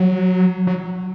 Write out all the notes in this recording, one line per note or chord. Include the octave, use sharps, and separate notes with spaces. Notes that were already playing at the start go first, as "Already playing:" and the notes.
Already playing: F#3
F#3